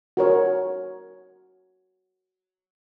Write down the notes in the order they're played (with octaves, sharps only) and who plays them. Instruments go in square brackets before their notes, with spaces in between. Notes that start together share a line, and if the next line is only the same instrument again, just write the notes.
[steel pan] F#4 A#4 C#5